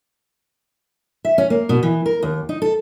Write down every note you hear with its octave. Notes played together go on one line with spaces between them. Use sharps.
E5
C#4
A#3
B2
E3
A#4
D#2
D#4
A4